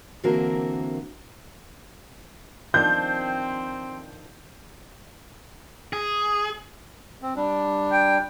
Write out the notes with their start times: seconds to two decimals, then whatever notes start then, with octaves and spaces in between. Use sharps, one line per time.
0.24 D3 E3 A#3 C4 F#4 A#4
2.74 D#3 F3 C4 D4 G6
5.93 G#4
7.22 C4
7.36 G3 D4
7.92 G5